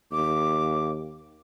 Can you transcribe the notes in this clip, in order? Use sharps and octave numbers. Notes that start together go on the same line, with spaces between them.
D#2 D6